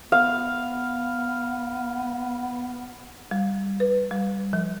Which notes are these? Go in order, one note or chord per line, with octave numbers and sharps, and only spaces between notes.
B3 F5
G3
B4
G3
F3